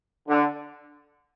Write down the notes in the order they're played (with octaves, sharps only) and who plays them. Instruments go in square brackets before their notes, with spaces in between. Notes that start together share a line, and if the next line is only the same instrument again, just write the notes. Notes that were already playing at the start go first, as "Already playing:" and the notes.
[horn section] D3